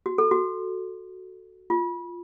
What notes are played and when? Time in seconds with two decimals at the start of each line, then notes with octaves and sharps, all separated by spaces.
0.06 F#4
0.18 A4
0.31 F#4
1.70 F4